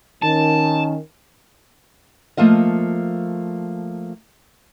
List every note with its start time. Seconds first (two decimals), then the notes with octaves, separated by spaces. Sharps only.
0.22 D#3 C#4 A5
2.37 F3 A3 A#3 F4 D#5